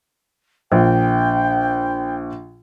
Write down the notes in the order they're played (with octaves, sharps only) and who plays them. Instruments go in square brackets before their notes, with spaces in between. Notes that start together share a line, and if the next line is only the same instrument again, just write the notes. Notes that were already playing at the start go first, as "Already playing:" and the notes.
[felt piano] A#1 [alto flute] G5